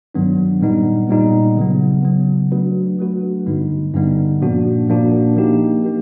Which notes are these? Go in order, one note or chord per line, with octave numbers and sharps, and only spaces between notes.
G2 D#3 F#3 B3 D4
A#2 G3 B3 D#4
A#2 G3 B3 D#4
C#3 F#3 B3
C#3 F#3 B3
F#3 A3 D4 F#4 B4
F#3 A3 D4 F#4 B4
G2 D3 G3 B3 D#4
G2 D3 G3 B3 D#4
A#2 F3 A#3 D4 F#4
A#2 F3 A#3 D4 F#4
F3 A#3 D#4 G4
A#3 D#4 G4